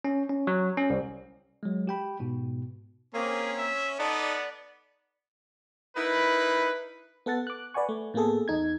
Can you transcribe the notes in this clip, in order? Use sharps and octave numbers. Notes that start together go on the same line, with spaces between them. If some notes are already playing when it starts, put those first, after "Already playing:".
C#4
C#4
F#3
C#4
C2
F#3 G#3
G4 G5 B5
G#2 B2
A#3 C4 C#4 G#4
E5
B3 D#4 A4 D5
D#4 E4 A#4 B4
B3 A4 F#5 A6
D6 F#6
B4 D5 F#5 G#5 C#6
A3
A2 A#3 B3 G#4 A4
E2 D#4 G#6